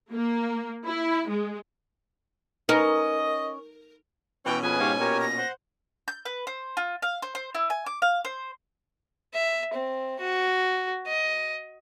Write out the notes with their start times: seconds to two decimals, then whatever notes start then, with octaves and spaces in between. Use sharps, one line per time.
0.11 A#3
0.85 E4
1.29 G#3
2.69 C#4 D#4 A#4 B4 D#5
4.45 B2 E3 C#4 G5 C#6
4.62 F2 G#4 B4 G#5
4.80 G#2 G4 C#5 F5
5.00 A#2 G4 A#4 C#5
5.20 A#6
5.38 C5 F#5 C6
6.08 G6
6.25 B4
6.47 C5
6.77 F4
7.02 F5
7.22 C5
7.35 C5
7.55 E4
7.70 G#5
7.86 D6
8.02 F5
8.25 C5
9.34 E5
9.74 C4
10.19 F#4
11.07 D#5